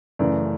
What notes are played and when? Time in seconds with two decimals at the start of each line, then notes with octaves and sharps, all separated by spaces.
0.19 F#2 C#3 E3 A3 D5